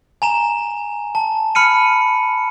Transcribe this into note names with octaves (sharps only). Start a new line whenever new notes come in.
G#5 A#5 E7
A5
B5 F6 C#7 D#7